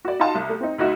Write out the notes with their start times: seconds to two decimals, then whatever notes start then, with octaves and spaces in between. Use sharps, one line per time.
0.05 F#4 D5
0.19 D#4 F4 F#4 F5 A5 C6
0.35 C2
0.49 A3
0.61 C4 D#4
0.78 D2 D#4 F#4 E5